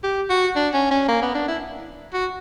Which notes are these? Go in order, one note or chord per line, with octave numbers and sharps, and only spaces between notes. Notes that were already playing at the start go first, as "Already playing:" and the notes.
G4
F#4
D4
C#4
C#4
A#3
B3
D4
E4
F#4